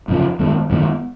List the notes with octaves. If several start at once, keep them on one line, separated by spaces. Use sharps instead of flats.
F#2 C#3 F3
F#2 D#3 G#3 B3
F#2 D#3 G#3 B3